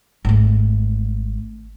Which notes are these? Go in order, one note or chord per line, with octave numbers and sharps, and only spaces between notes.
G#1 A3